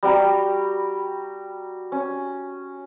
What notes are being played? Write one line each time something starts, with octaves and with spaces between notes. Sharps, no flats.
G3 F#4 G5 A#5
C#4